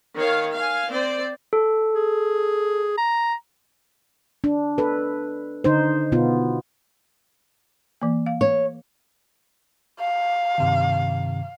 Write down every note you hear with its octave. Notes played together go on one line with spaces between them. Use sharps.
D#3 C#5 F5
F5 G#5
C4 C5 D5
A4
G#4
A#5
D4
A4 B4
D3 D#4 C5
B2 B3 F4
E3 A#3
F5
C#5
F5
G2 C3 D#3